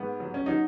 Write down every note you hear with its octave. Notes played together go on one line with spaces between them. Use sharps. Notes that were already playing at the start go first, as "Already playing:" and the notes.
Already playing: G#2 B3
F#3
C#4
F#3 D#4